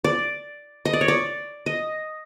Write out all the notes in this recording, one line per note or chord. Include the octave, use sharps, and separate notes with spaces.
D5
D#5
D5
C#5
D5
D#5